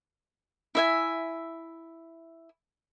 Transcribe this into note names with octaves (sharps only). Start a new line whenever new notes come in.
E4 E5 G#5